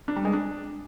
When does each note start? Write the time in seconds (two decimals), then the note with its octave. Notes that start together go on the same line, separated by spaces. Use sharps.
0.08 D4
0.16 G3
0.25 G#3
0.33 D4